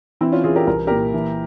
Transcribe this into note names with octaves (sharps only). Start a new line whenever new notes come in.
E3 C4 E4
C#4 F4
E3 F4 G#4
G4 A#4
C2 A#4
A#2 G4 A#4
E3